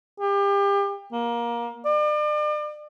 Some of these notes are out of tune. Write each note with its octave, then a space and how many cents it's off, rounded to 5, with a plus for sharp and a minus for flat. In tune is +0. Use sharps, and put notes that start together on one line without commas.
G4 +30
A#3 +20
D5 +40